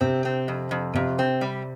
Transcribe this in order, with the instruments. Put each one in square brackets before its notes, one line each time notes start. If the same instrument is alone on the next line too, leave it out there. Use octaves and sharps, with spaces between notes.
[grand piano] C3 [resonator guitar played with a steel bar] C4
[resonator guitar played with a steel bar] C4
F2
F2
[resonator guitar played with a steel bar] F2 [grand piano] C3
[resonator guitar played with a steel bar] C4
G3